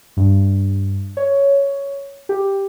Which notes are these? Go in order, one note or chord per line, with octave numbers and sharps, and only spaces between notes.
G2
C#5
G4